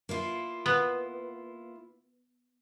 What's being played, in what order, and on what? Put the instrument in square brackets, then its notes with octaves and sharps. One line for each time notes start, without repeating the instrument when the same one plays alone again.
[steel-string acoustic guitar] A#3 E4 F4
[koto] B3